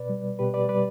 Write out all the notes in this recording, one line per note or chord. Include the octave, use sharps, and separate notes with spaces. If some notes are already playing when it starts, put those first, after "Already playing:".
Already playing: B2 B4 D5
G3
B2 G4 B4
B4 D5
G3 B4 D5